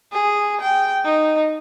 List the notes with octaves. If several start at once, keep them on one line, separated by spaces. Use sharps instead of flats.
G#4
G5
D#4